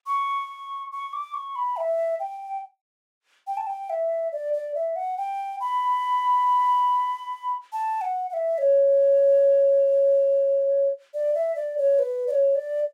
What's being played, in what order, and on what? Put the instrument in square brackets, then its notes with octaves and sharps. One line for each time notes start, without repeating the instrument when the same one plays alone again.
[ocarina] C#6
C#6
D6
C#6
B5
E5
G5
G5
A5
G5
E5
D5
D5
E5
F#5
G5
B5
A5
F#5
F#5
E5
C#5
D5
E5
D5
C#5
B4
D5
C#5
D5